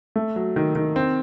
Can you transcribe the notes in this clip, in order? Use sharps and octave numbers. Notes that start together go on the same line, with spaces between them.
A3
F#3
D#3
D#3
C4